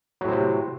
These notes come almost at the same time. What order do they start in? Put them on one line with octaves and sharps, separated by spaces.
F#3 A2 C4 C3